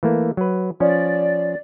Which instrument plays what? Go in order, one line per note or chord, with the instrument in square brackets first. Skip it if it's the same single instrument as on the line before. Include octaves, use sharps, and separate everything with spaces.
[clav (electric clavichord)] E3 A3 A#3
F#3 B4
[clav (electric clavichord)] F3 C#4 [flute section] D5